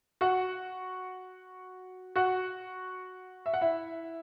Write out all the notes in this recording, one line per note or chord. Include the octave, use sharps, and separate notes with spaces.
F#4 F#5
F#4 F#5
E5
F#5
E4 E5